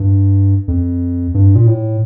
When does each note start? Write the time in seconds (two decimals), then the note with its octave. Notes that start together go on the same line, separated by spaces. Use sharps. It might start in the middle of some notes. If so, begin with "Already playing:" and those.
Already playing: G2
0.68 F2
1.34 G2
1.55 A#2
1.67 A2